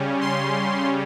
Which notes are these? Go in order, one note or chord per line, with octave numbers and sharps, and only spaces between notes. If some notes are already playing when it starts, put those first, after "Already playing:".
Already playing: C#3 G3 C#4
C6